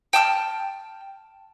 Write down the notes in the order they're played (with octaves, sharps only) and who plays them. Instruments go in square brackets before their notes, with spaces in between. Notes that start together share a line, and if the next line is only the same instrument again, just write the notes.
[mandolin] G5 A5 D#6 F6